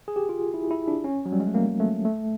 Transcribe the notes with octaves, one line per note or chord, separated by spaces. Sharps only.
G#4
G4
F4
E4
E4
D4
C#4
F#3
G3
G#3
A3
A#3
A3
A3